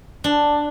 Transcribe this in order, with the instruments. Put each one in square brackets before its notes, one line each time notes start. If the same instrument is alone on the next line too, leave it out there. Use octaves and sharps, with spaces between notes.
[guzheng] D4